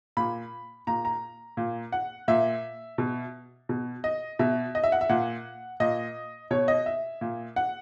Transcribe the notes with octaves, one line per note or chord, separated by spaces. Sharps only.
A#2 B5
A#2 A#5
A#5
A#2
F#5
A#2 E5
B2
B2
D#5
B2 E5
D#5
E5
F#5
E5
A#2 F#5
A#2 D#5
B2 C#5
D#5
E5
A#2
F#5